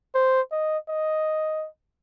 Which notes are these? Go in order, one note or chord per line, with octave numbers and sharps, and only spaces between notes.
C5
D#5
D#5